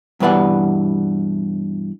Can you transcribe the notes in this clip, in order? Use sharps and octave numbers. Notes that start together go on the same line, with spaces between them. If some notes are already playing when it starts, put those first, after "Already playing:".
G2 B2 E3 B4 D5 F#5